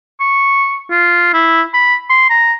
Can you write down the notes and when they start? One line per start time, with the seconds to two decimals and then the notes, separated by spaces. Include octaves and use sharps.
0.20 C#6
0.90 F4
1.33 E4
1.74 B5
2.10 C6
2.30 A#5